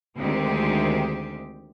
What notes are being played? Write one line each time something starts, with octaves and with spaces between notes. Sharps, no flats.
D2 D#3 G#3 C4 G4